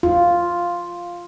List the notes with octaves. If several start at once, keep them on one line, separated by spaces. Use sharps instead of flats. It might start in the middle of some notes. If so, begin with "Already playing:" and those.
F4